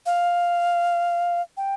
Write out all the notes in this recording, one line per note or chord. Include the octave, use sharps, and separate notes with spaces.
F5
G5